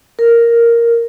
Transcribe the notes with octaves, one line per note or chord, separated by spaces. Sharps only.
A#4